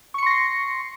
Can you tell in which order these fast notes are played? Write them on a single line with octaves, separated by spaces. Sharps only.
C#6 C#7 C6 A#6 C7